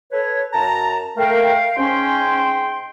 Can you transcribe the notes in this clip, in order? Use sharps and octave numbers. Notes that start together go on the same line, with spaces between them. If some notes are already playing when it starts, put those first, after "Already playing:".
A4 B4 C#5
F#2 A5 A#5
A3 A#4 F5 G5
G#2 C#4 G5 C6